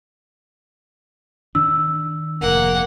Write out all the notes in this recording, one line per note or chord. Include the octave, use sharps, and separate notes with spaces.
D#3 D4 E6
F1 G#2 A#3 F#5